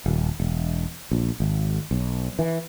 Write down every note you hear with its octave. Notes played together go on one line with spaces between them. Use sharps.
D#1
E1
A#1
G#1
B1
E3